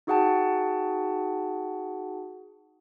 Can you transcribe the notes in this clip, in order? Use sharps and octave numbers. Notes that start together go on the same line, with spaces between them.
D#4 F#4 G#4 F#5 G5 A5